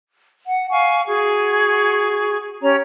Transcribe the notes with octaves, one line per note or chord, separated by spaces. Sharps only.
F#5
F5 G#5 C#6
F#4 G#4 C#6
C#4 G4 C#5 A#5